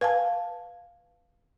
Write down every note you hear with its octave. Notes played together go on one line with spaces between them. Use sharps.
B4 F5 G#5 A5